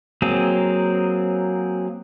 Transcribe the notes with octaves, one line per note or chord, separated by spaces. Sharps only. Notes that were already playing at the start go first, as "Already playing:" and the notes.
F#3 A#3 C4 G#4